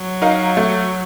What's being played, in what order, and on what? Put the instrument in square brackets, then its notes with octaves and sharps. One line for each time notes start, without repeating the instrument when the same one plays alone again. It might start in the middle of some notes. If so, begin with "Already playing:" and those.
Already playing: [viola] F#3
[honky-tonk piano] D#4 A#4 F5
A3